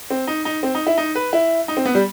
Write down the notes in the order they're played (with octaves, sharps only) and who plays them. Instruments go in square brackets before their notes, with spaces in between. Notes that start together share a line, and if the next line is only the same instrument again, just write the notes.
[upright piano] C4
D#4
D#4
C4
D#4
E4
D#4
B4
E4
D#4
C4
B3
G3